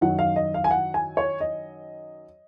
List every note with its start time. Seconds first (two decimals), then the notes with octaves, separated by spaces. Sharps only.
0.01 F#2 D#3 F#3 F#5
0.19 F5
0.36 D#5
0.54 F5
0.64 G#5
0.71 F#5
0.94 G#5
1.17 C#5
1.41 D#5